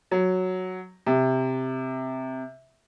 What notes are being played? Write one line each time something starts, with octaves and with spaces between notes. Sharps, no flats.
F#3
C3